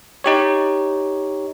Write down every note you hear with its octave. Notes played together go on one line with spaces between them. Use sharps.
D#4 G4 C#5